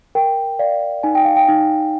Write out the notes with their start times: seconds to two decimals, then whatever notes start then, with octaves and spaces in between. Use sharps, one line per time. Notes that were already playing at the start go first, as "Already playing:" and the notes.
0.15 A#4 G5
0.59 D5 F5
1.03 D#4 G#5
1.15 G5
1.25 F5
1.36 G5
1.48 D#4